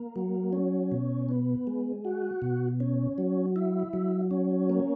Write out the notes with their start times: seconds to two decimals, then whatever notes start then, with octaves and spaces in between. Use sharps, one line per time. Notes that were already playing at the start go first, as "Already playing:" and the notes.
Already playing: A#3
0.16 F#3
0.53 C#4
0.92 B2
1.29 B3
1.67 G#3
2.05 F#4
2.42 B2
2.80 C#4
3.18 F#3
3.56 E4
3.93 F#3
4.31 C#4
4.70 A#3